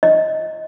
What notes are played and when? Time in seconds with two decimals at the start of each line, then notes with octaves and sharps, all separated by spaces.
0.03 D#5